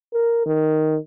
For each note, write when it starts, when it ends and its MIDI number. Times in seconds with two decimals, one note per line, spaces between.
0.13 0.45 70
0.46 0.97 51